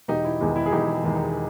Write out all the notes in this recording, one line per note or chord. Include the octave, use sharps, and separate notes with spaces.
E1 D#4 G4
E4
E2 D#3 G#3 D#4
E4
G#4
E1 D#4 G4
E2 D#3 G#3
D#4